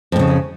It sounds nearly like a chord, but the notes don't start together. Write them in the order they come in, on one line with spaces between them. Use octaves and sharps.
F2 A#2 C#3